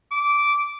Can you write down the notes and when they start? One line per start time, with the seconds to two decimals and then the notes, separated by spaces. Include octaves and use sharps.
0.11 D6